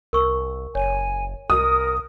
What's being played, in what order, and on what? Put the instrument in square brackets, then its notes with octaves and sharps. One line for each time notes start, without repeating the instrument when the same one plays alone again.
[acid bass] C2 [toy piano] A#4 C#6 E6
[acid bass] F#1 [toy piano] C#5 [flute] G#5
[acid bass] C2 [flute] A#4 [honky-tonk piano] D#6